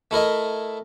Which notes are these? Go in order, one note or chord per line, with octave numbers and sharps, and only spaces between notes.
A3 E4 A#4 D#5